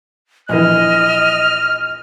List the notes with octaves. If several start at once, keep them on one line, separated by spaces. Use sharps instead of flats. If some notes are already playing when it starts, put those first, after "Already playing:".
A#1 E3 D#5 F6